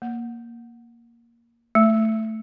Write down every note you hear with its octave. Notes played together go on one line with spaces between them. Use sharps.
A#3
A3